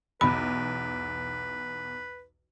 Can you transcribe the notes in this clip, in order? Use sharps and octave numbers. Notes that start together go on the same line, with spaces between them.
B1 E2 B4 B5